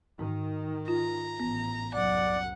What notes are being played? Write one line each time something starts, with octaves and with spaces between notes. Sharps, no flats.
G#2 D#3
F4 A#5
A1 B3
C2 F#2 F#3 D5 F#5